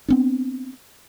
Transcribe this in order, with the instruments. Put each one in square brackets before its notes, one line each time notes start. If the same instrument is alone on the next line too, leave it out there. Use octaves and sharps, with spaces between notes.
[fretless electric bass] B3 C4 D4